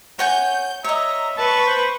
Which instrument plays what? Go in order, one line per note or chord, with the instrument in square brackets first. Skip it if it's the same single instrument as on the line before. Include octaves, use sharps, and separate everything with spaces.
[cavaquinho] C#5 F#5 G#5 [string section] G6
[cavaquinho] C#5 D#5 [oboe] E5 [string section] A#5
[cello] B4 [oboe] A5 [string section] C#6
[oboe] C5